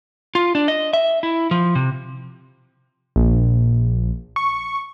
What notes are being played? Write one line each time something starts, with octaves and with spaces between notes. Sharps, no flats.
F4
D4
D#5
E5
E4
F3
C3
A#1
C#6